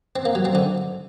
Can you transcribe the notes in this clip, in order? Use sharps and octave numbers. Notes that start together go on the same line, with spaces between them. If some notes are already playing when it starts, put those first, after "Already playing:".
C4
A#3
F#3
C4
D3